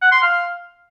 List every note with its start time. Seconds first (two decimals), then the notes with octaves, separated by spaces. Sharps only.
0.02 F#5
0.12 C6
0.22 F5